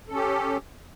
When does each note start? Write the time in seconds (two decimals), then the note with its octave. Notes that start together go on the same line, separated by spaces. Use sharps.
0.08 A4
0.12 C#4
0.15 G4